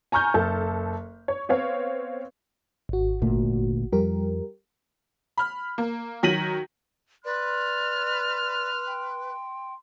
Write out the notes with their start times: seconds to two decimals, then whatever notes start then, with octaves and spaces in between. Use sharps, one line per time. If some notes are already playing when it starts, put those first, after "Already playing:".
0.12 G#5 A#5 C#6 F6 G6
0.34 F#1 A4 A5
1.28 C#5
1.49 B3 C4 C#5 F5
2.89 G#1 F#4
3.22 D2 A#2 A3
3.93 F2 G3 G4 A#4
5.37 B5 F6
5.78 A#3
6.23 D#3 F#3 A#6 B6 D#7 F#7
7.25 B4 D5 C6 F6
8.87 G5